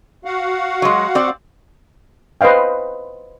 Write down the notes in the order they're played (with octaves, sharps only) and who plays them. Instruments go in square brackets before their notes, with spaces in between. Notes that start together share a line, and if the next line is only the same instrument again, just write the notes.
[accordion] F#4 F5 F#5
[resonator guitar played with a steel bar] F#3 G#3
C4 D5
[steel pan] B4 C5 D#5 F5 G5